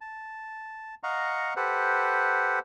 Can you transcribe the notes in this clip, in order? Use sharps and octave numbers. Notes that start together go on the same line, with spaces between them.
A5
D#5 F5 F#5 A#5 C#6
G4 A4 B4 C5 F#5